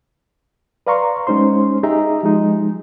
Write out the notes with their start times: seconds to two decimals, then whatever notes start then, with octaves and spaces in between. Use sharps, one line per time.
0.87 B4 D5 F5 A#5 C6 C#6
1.27 G#3 C#4 D#4 C5 C6
1.83 D#4 G4 G#4 D#5 E5 A#5
2.23 F3 G#3 D#4